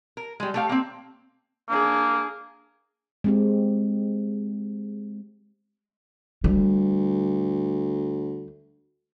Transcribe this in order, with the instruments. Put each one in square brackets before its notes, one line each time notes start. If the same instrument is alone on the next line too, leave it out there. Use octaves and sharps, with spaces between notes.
[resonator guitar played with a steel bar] A#4
G3 G#3
A3 G4 F5
A#3 C4
[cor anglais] A#3 [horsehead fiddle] D4 G#4
[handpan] G#3 C4 G4
[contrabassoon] D2 [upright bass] G3